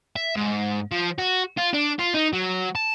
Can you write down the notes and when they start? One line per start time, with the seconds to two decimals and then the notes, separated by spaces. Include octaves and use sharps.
0.16 E5
0.36 G#2
0.91 F3
1.19 F#4
1.57 F4
1.73 D4
1.99 F4
2.14 D#4
2.33 F#3
2.75 A5